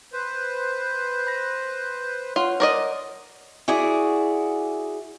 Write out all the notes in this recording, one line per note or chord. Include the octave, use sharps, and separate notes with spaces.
B4 C5
B5 A#6
F4 C#5 F#5 C6
A#4 D5 D#5
E4 F#4 G#4 D5